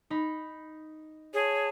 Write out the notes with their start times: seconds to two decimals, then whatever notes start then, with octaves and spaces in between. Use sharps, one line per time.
0.10 D#4 B5
1.34 G#4 C#5 A5